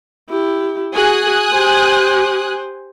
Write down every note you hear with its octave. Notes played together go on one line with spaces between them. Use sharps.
E4 G4
F#4 G#4 G#5 D#6 F#6
G4 C5